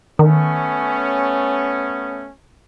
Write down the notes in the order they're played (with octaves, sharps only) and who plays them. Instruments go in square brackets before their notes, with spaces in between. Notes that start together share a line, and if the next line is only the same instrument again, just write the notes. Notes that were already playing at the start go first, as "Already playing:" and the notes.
[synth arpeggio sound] D#3 [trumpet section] A3 B3 C#4